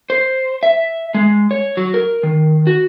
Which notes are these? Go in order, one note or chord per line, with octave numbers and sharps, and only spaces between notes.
C5
E5
G#3
C#5
F#3
A#4
D#3
F#4